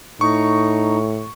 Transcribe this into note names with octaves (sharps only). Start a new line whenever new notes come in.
A2 D#4 C#6